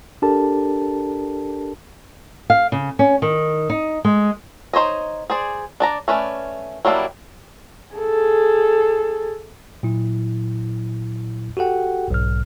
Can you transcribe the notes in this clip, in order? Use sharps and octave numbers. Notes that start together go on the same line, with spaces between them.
D4 G4 A4 A#4 A5
F5
C#3
C#4
D#3
D#4
G#3
D#4 C5 C#5 D#5
G#4 C5 D5
D4 D5 A#5
A3 C#4 B4 D5
F#3 G3 A#3 D4 E4
G#4 A4
A#2 F#3 E4
F#4 G4 A4 F#5 G5
B1 G#2 F6